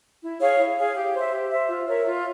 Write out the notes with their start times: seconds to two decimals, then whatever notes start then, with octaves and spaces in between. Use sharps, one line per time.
0.22 E4
0.40 G#4 C#5 F5
0.58 E4
0.77 G#4 C#5 F5
0.95 G4
1.14 C5 E5
1.32 G4
1.51 C5 E5
1.69 F4
1.87 A#4 C#5 E5
2.05 F4